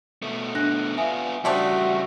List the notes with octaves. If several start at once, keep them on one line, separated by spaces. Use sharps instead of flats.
B2 A3
D4 F#6 A#6
B3 F4 E5 G#5
C#3 G3 A3 C4 D4 F#4